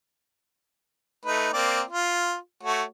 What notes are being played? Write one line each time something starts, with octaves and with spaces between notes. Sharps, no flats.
A3 D#4 B4
A#3 C4 D5
F4
A3 F#4 C#5